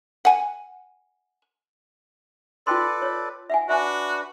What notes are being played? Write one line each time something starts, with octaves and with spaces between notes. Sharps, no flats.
F#5 G#5
F4 A4 B4 D5 G5 C6
C#5
E5 F#5 G#5
D4 F#4 B4 E5 G#5